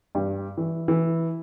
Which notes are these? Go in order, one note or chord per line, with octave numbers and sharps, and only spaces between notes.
G2
E3
E3